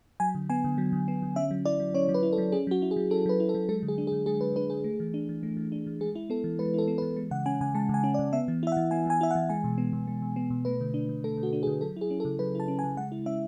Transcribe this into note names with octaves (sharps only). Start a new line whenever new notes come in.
F#3 G#5
D3
B3 G#5
D3
F#3
D3
B3
D3
C#4 E5
F#3
E4 D5
F#3
C#4 C#5
F#3
B4
E4
A4
F#3
C#4 G#4
F#3 F#4
E4
G#4
F#3
C#4 A4
F#3 B4
E4
A4
F#3
G#3 A4
D3
G#4
D4
G#4
D3
G#3 G#4
D3 B4
D4 B4
D3 G#4
A3
E3
D4
E3
A3
E3
D4
E3
G#3 G#4
E4
B3 A4
E3
G#3 B4
E4 A4
B3
B4
E3
G#3
C#3 F#5
C#4 G#5
C#3 G#5
G#3 A5
C#3 G#5
C#4
D5
C#3
B3 E5
E3
E4 E5
F#5
E3
B3 G#5
E3 G#5
E4 E5
F#5
E3
G#3 G#5
B2
B3
B2
G#3
B2
B3
B2
A3 B4
D3
D4
D3
A3 A4
D3
F#4
D4
G#4
D3
F#3 A4
E4 G#4
C#4
A4
C#3
F#3 B4
E4 A5
C#4
G#5
C#3
G#3 F#5
E4
C#4 E5